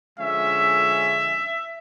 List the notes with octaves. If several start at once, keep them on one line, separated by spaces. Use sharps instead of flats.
D3 F3 G#3 C#4 E5